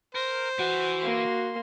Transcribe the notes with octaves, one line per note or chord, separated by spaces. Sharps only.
A#4 C5
E3 F#4
A#3 C6